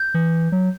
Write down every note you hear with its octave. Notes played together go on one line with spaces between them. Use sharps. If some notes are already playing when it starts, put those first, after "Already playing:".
Already playing: G6
E3
F#3